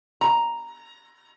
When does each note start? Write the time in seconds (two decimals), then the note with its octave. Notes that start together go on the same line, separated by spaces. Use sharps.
0.21 A#5